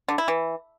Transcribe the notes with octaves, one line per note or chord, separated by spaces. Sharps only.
D3
E4
E3